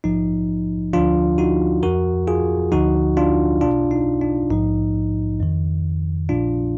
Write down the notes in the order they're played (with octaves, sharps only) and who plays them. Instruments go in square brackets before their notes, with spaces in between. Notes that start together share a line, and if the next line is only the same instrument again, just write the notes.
[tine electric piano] A#1 G#2 F3 D#4
D2 D3 F3 D4 F4
D#4 F#4
F2 F3 F#4 A#4
F4 G#4
D2 D3 F3 D#4 F#4
D4 F4
B1 B2 D4 F4
D#4
D4
A#1 G#2 F3 D#4
F2 D#3
A#1 A#2 F3 D4 F4